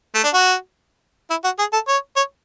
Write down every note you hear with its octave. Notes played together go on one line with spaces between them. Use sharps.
A3
D4
F#4
E4
F#4
G#4
A4
C#5
C#5